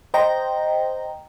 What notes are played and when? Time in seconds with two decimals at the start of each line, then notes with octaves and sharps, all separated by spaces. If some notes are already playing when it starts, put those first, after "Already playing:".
0.14 C5 D#5 G5 A#5